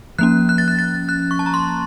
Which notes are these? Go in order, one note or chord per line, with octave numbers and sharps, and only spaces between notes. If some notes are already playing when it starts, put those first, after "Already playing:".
F3 A#3 C#4 F#6
F#6
A6
F#6
A6
F#6
C#6
A5
A#5
C6